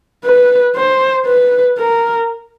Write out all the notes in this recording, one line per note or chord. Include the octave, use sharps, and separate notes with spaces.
B4
C5
B4
A#4